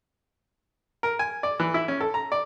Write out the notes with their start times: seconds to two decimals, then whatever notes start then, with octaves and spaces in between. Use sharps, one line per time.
1.03 A#4
1.19 G#5
1.43 D5
1.60 E3
1.74 E4
1.88 C#4
2.01 A4
2.14 A#5
2.32 D5